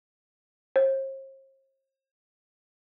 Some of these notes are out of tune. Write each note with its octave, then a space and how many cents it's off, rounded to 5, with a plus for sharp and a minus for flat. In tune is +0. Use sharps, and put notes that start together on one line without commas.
C5 +45